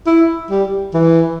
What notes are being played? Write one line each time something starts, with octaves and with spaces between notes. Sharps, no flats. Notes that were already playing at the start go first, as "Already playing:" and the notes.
E4
G3
E3